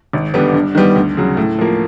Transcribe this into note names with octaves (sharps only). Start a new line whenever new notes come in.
G#1
G2 D3 G3 B3
G2
D#3 G3 B3
D2
C#3 F#3
A2
F3 A#3